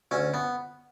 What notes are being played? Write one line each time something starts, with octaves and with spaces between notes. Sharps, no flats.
D2 C#4
B3